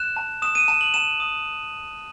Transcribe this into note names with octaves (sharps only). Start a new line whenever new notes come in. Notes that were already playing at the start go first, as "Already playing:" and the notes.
Already playing: F#6 E7
A5
D#6 E7
D#7
A5 E7
F#7
A5 E7
D#6